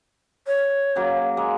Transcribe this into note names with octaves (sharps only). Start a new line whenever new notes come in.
C#5
C#3 F#3 A#3
G#3 A#3